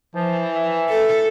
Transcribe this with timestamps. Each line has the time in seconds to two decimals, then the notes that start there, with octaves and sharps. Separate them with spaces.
0.15 E3 F3
0.55 E5
0.89 A4